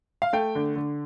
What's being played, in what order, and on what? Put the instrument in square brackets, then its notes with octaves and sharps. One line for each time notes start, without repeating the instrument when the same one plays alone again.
[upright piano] F5
A3 G5
D3
D3